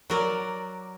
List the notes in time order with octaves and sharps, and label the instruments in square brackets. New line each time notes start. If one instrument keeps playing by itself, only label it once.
[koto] F#3 A#4 D5